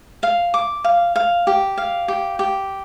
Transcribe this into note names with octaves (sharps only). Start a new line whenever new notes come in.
F5
D6
F5
F5
G4
F5
G4
G4